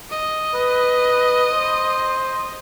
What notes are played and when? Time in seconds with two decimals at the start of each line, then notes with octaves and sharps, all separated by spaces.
0.11 D#5
0.55 B4
1.53 C5